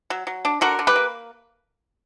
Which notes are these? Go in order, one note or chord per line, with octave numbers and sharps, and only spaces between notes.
F#3
F#3
D4
D3 F#4 A#4
D3
G4 B4
A#3